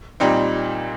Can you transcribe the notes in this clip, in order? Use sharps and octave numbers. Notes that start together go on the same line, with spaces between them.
A#2 G3 C4 D#4